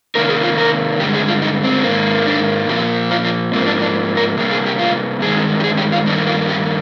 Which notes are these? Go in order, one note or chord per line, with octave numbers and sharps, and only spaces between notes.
C3 D#3 A#3 A#4
G#4
F4
A#4
G2 D3 G#3 G4
G#4
F4
D#4
C4
G#2 D#3 A#3
D4
A#2 F3 A#3 G4
F4
F4
G#2 F3 A#3 C4
D4
D4
A#4
C3 G3 A#3 G#4
G#4
G4
F4
G2 D#3 G#3 G#4
G4
G#4
G4
F4
G2 D#3 G3 A#3 D4
F4
G4